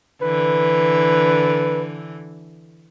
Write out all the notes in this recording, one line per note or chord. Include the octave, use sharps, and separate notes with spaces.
D3 E3 B4